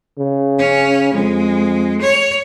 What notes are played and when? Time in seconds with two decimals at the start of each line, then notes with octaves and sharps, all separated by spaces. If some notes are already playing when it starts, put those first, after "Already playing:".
0.18 C#3
0.58 C#4
1.13 F2 G#3
2.01 C#5